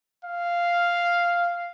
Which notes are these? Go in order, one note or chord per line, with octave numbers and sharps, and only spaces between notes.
F5